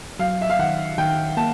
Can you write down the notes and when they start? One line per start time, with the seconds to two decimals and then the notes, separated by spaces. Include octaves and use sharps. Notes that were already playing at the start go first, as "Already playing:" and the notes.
0.19 F#3 F5
0.41 E5
0.50 F5
0.59 D#3 F#5
0.98 D#3 G5
1.37 A#3 A5